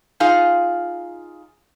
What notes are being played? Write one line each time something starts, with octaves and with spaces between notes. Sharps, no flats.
D#4 F4 G#4 F5